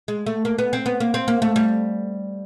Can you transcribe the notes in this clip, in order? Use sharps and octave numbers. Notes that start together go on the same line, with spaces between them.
G#3
A3
A#3
B3
C4
B3
A#3
C4
A#3
A3
G3